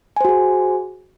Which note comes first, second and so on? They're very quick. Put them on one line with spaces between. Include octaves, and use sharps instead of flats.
G#5 C5 F#4 G#4